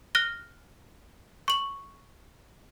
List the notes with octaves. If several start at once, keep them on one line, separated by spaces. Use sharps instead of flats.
F6 F#6 A#6 G7
C#6 F#7